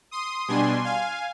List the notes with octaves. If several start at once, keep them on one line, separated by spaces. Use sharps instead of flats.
C6 D#6
B2 G3 D4 G#5 C6
F5 G#5